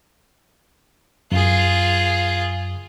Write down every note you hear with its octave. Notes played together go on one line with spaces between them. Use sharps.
F#2 F4 G#4